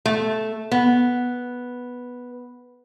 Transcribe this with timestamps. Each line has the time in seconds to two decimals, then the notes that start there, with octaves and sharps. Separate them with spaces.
0.06 A3
0.72 B3